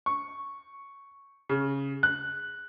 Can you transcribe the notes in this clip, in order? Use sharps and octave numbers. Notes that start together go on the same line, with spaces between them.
C#6
C#3
F#6